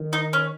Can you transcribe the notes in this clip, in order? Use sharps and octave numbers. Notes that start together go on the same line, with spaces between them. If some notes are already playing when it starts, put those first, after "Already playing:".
Already playing: D#3
D#4
C#4